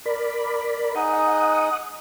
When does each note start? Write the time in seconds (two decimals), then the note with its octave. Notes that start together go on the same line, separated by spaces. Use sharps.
0.05 A#4 D5 B5
0.95 D#4 G#4 D#5 F#5 D#6